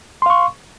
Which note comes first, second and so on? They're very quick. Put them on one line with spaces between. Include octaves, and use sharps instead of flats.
C6 F5 C#6